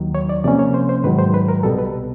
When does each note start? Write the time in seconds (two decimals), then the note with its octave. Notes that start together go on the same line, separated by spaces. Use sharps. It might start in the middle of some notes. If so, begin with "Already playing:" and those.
Already playing: D#2 D#3 F#3
0.15 C#5
0.29 D5
0.44 C3 F3 A#3 C#4 D5
0.59 C#5
0.74 C5
0.89 C5
1.04 G#2 D#3 F#3 B4
1.18 C5
1.34 B4
1.48 A#4
1.63 C2 B2 G3 B3 A4
1.78 B4